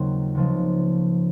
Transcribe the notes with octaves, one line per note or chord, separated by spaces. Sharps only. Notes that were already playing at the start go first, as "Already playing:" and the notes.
Already playing: D#2 C#3 F#3 C4 F4
C#2 C#3 F3 A#3 D#4